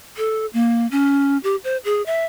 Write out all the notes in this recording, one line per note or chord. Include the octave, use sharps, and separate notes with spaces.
A4
A#3
C#4
G4
C5
G#4
E5